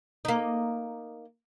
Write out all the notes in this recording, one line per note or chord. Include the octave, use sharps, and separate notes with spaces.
A#3 D#4